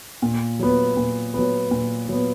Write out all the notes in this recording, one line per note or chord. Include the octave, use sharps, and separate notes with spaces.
A#2
F#3 B3
A#2
F#3 B3
A#2
F#3 B3